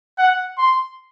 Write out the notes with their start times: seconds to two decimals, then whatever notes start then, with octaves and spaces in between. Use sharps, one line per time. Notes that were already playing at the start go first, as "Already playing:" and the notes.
0.18 F#5
0.58 C6